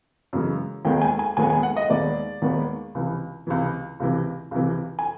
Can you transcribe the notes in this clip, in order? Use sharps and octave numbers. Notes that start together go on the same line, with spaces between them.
F#2 C#3 E3 G#3
D#2 D#3 G#3 B3 G5
G5
G#5
G#5
D#2 D#3 G#3 B3 G#5
G#5
F#5
D#5
D#2 D#3 G#3 B3 D5
D#2 D#3 G#3 B3
C#2 C3 E3
C#2 C3 E3
C#2 C3 E3
C#2 C3 E3
G#5